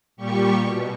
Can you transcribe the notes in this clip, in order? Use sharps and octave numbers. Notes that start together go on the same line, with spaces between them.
A#2 G3 G4 C#6
B2